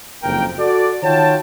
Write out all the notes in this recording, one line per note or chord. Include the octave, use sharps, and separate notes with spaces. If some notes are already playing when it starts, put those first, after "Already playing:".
F#1 F2 G#2 A#3 A#4 G5
F#4 A4 D5
D#3 F4 F#4 C#5 G5 A5